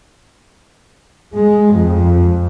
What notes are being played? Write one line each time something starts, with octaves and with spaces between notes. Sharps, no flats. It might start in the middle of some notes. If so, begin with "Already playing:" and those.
G#3
F2